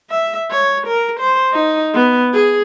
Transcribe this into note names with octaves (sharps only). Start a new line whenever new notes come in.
E5
C#5
A#4
C5
D#4
B3
G#4